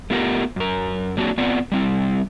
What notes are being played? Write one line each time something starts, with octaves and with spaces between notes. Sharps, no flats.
A3 B3 F4 G4 A#4 F#5
F#2 A#4
F#3 A#3 C4 D4 F#4
B3 C4 F4 D5 F#5
G3 C4 E4